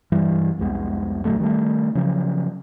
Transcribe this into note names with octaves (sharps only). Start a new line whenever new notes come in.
G2 E3 G3
C2 F2 G#3 B3
A#2 D3 F#3 A3
D#3 G3 A3
C#3 F3 F#3